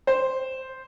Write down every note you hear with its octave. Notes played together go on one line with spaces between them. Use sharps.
C5